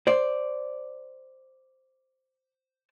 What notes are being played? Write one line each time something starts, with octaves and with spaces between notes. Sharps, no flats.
C5 D5